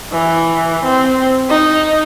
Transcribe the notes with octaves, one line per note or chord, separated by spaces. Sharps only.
E3
C4
D#4